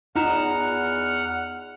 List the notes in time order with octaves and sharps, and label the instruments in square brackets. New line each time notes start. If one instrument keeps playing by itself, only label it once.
[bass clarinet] E2 [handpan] D#4 [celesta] F4 A#5 E7 [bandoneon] F#5 F6